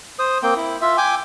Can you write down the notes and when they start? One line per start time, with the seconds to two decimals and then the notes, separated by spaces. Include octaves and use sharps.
0.19 C5 D#6
0.43 A#3 C4 G5
0.56 E4
0.82 F4 E5
0.98 G5 G#5 D6